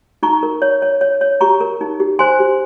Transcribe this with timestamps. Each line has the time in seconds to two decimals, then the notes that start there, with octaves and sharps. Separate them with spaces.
0.23 D#4 A#5 C#6
0.43 A#4
0.62 C#5
0.82 C#5
1.01 C#5
1.21 C#5
1.41 G4 A#5 C#6
1.61 A#4
1.81 D#4
2.00 G4
2.19 C5 G#5 C6
2.40 G4